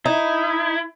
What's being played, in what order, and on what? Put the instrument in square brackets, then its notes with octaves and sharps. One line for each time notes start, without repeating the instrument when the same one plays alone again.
[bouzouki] D#4 [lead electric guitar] E4